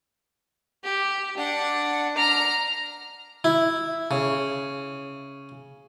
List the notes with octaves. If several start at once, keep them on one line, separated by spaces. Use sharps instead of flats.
G4
D4 F#5
A#5 F6
E4
C#3